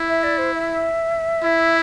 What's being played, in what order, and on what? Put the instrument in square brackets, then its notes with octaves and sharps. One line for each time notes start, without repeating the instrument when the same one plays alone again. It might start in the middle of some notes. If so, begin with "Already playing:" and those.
Already playing: [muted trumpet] E4
[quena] E5
D5
C5
E5
[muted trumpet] E4